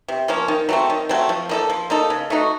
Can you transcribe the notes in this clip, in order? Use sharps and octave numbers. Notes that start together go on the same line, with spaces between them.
C3
F3 A#3 C#4
D#3
F#3 A3 C4
D#3
F#3 A3 C4
F3
A#3 D#4 A4
F3
A#3 D#4 A4
C#3
A3 D#4 F#4